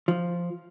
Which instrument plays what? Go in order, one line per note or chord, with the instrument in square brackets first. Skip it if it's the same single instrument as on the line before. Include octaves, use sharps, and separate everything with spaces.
[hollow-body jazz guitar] F3